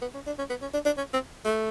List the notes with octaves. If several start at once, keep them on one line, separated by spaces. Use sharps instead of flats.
B3
C#4
D4
C#4
B3
C#4
D4
D4
C#4
C4
A3